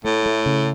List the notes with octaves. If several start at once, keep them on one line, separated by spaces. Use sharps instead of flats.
A2 A3
A3
C#3